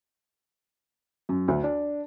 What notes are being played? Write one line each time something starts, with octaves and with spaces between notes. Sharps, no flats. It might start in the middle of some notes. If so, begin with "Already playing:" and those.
F#2
D2
D4